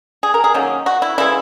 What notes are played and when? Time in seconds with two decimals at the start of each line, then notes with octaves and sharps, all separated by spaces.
0.23 G#4
0.34 A#4
0.44 G#4
0.54 D#3 F#3 A#3 C#4
0.86 F#4
1.02 E4
1.18 C#3 E3 G#3 E4